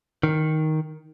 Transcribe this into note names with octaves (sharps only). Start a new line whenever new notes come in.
D#3